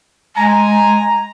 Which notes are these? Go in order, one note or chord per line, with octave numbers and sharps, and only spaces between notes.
G#3 G#5 A#5